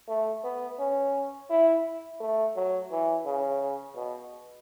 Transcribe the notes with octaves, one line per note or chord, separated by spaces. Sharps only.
A3
B3
C#4
E4
A3
F#3
E3
C#3
B2